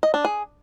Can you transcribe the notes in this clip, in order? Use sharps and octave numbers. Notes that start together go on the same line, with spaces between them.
D#5
D4
G#4